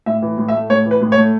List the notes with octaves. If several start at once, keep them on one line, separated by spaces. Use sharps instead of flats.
A2 E5
E3
A2
E5
A3
A2 C#5
E3
B4
A2
C#5
A3